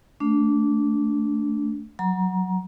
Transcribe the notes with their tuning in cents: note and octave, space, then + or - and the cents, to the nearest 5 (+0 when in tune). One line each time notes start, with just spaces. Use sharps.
A3 +0 D4 -20
F#3 +0 A#5 +25